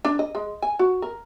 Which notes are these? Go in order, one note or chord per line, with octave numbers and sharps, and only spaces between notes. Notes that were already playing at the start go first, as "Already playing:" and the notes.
D4
D#5
G#3
G#5
F#4
A#4